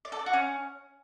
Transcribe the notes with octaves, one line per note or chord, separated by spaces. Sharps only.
D5
A4
D5
F#4
C#4